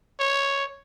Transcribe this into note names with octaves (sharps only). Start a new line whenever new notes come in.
C#5